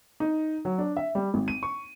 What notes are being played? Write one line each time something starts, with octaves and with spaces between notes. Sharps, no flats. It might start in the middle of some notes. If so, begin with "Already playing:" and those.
D#4
F#3
D4
E5
G3
G#1
D#7
C#6